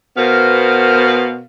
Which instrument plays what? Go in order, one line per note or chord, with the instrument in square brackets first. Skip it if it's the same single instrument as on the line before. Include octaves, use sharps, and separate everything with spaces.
[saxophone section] B2 B3 A#4 C5 F5